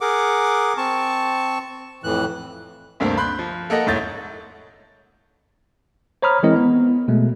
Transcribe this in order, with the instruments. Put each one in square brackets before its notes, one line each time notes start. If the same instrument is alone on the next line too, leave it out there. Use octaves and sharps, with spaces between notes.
[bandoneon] G#4 A#4 F#5 D6
C4 A5 C#6
F2 A2 E3 F#6
[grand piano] D2 G2 C3 A#3 C4
B5 C6 F#6 G6
F3
A#3 A4 D#5 F#5 A#6
E1 G#2 E4 C#5 G6 A6
[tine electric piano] C5 C#5 A#5 B5 D#6 F6
E3 G#3 C4 E4 A#4 D#5
B3
B2 G#3 A3